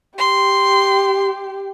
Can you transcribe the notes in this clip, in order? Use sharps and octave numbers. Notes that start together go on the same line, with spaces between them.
G4 C6